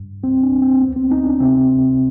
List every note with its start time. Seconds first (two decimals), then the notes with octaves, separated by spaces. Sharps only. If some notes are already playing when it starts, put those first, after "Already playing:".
Already playing: G2
0.23 C2 C4
0.43 D4
0.52 C2
0.62 C4
0.81 D2 B3
0.96 C4
1.11 D2 D#4
1.26 D4
1.40 C3 C4
1.70 C2